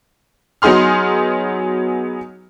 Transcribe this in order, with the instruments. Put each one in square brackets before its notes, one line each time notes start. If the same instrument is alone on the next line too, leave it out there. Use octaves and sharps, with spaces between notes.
[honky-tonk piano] F#3 B3 D#4 G#4 C6 F6